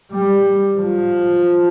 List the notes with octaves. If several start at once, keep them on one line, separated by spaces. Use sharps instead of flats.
G3
F3